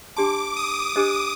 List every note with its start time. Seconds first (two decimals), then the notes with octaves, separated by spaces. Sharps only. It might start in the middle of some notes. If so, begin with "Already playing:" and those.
0.16 D4 G4 D5 A5 C6 D6
0.56 D#6
0.96 D4 G4 C5 D#5